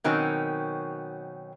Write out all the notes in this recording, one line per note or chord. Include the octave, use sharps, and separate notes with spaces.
B2 D#3 F#3 C4 C#4